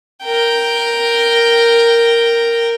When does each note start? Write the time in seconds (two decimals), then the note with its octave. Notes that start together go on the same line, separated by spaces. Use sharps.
0.24 A#4 G5